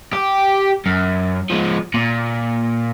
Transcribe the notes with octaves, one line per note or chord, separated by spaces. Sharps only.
G4
F#2
F3 G#3
A#2